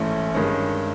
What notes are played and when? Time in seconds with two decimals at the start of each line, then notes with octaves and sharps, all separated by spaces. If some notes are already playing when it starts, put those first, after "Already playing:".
Already playing: A1 G#2 E3 A3 C#4
0.34 G2 D#3 G#3 C#4